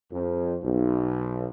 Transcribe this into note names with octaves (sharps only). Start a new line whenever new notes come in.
F2
B1